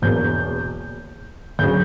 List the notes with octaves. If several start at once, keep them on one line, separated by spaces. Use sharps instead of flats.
E1 E2 B2 A#3 G6
D2 C#3 F#3 G6